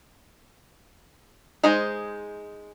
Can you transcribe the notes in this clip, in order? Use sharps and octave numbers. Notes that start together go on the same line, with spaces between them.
G#3 D#4 G#4 C5 D#5